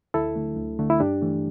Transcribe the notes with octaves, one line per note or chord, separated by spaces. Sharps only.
D2 E4 A4
D3 A3
D2
D3 A3
E4
G2 D4 G4
E3 A3